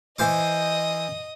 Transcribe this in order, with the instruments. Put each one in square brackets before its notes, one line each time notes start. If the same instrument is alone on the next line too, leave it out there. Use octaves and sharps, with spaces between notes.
[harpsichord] E3 C5 D6 [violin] D#5 D#6